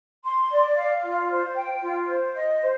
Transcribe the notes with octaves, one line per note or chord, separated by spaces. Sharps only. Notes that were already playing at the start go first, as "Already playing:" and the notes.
C6
D5
F5
F4
C5
G5
F4
C5
D#5
C5